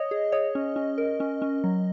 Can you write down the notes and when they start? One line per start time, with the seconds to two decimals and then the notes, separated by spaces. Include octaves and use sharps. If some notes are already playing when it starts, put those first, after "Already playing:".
Already playing: C#5 D#5
0.11 G#4
0.32 C#5 D#5
0.55 C#4
0.76 C#4
0.98 A#4
1.20 C#4
1.42 C#4
1.64 F#3